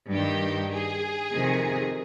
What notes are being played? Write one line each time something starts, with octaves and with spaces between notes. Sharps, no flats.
G2 D#3 G4
G#4
F2 C3 D#3